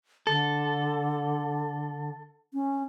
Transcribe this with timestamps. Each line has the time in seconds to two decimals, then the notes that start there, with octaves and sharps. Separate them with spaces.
0.27 D3 A4
2.54 C#4